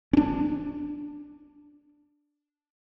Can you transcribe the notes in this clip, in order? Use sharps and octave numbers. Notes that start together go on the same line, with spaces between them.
C#4 D4